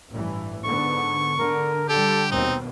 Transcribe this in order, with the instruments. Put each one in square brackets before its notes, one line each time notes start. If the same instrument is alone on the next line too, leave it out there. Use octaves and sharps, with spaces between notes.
[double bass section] A1 G2 E3
[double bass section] G#2 D3 B3 [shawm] C#6
[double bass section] D3 [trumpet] A#4
[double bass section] D3 G3 [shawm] G4 [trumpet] A4
[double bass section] D#2 B2 [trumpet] C4 [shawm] D#4